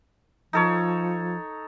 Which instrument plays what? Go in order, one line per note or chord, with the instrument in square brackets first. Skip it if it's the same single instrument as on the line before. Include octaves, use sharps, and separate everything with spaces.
[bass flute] F3 [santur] D#4 A4 C#5